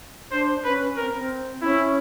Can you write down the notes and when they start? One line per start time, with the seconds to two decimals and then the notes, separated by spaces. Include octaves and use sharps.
0.31 D4 C5
0.64 C#4 B4
0.96 C4 A#4
1.16 C4
1.62 C#4 E4